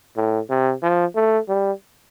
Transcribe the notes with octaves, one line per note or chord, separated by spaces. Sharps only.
A2
C3
F3
A3
G3